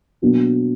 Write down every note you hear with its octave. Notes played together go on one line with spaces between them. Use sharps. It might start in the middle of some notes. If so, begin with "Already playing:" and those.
B2 F#3 A#3 D4